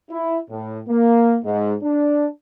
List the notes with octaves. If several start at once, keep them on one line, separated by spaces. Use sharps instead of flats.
E4
A2
A#3
G#2
D4